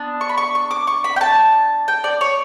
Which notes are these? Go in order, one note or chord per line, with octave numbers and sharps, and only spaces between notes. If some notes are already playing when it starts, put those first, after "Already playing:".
Already playing: B3 D4
C#6
B5
C#6
C#6
D6
C#6
B5
G5
A5
G5
D5
C#5